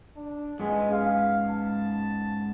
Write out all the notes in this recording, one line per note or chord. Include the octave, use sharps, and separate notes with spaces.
D4
G#2 G#3 B3 C#4
F5
A5